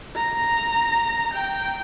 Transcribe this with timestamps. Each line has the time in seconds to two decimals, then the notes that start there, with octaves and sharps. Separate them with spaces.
0.15 A#5
1.34 G5